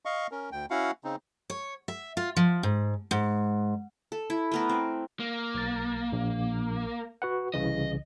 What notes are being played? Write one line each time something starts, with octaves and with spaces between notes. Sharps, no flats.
D#5 F5 C#6
C#4 A#4
D2 G5
C#4 E4 F#4 F5 F#5
C#3 C4 D#4
C#5
E5
F4
F3
G#2
G#2
A4
E4
A3 B3 A#4
C4
A#3
B1 A6
A#1
F#4 B4 F#5
C2 C#3 E3 D#5